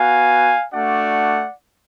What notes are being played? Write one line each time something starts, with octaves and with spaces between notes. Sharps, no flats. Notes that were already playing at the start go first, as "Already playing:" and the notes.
Already playing: B3 F#4 F5 G#5
A3 D4 F#4 D5 F#5